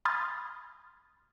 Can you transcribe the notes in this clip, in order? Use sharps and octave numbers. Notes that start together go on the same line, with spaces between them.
B5 C6 D#6 F6 G#6 A6